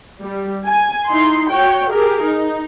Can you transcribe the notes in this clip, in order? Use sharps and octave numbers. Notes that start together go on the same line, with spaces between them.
G3
G#5
D#4 E4 C6
F#4 C#5 G5
G4 G#4 A#4
D#4